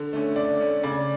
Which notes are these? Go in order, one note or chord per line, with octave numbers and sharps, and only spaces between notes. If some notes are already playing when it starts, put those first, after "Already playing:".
Already playing: D3
A3 C#4
D3 D5
A3 C#4
C#3 D5